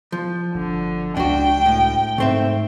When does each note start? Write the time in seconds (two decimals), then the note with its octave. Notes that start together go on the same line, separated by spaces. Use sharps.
0.12 F3
0.55 G1 D3
1.17 C#2 D4 F#4 G5
1.66 A2
2.18 G#2 A3 C4 E5